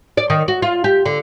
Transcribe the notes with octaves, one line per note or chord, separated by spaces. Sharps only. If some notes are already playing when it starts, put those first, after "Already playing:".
D5
D#3
F#4
F4
G4
D3